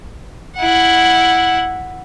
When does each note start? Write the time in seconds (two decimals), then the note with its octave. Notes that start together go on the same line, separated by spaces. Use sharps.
0.56 E4 F#5